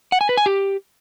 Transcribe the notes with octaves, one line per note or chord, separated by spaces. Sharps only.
F#5
G#5
B4
G#5
G4